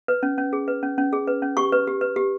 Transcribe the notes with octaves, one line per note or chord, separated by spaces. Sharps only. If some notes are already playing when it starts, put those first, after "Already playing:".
B4
C#4
C#4
G#4
B4
C#4
C#4
G#4
B4
C#4
G4 C#6
B4
G4
B4
G4